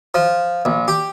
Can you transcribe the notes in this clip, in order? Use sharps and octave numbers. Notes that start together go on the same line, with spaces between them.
F3
A#1
G4